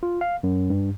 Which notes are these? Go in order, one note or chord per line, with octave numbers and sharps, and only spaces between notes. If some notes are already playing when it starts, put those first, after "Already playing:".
F4
F5
F#2
G2